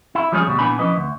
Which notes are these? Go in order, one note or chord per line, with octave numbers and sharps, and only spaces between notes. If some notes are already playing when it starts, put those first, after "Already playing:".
E4
F3 G3 G#3 C#4 G4 G#4
D2 B2 G3
A#2 E3 B3 D4 G#5 B5
E3 F3 C#4 B4 D#5
D2